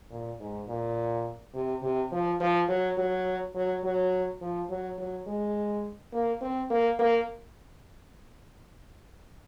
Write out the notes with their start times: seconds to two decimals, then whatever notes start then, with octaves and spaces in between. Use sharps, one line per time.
0.11 A#2
0.40 G#2
0.68 A#2
1.54 C3
1.83 C3
2.12 F3
2.40 F3
2.68 F#3
2.97 F#3
3.55 F#3
3.84 F#3
4.41 F3
4.70 F#3
4.98 F#3
5.27 G#3
6.13 A#3
6.41 C4
6.70 A#3
6.99 A#3